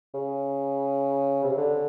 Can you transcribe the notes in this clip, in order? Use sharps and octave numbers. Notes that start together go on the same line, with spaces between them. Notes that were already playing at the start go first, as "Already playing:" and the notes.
C#3
C3
C#3
D3